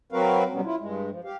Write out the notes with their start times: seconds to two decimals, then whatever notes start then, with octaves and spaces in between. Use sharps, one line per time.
0.12 F#3 C4 F#4 A#4 B4 F5
0.52 B2 F#3 G3 B3 C#4
0.65 E4 F4
0.80 G2 G#3
1.10 F3
1.24 G4 F5